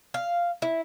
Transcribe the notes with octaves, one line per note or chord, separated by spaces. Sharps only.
F5
E4